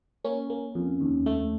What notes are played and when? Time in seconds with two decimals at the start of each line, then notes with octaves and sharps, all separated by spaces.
0.24 A#3 C#4
0.50 A#3
0.75 F2
1.01 D#2
1.26 A3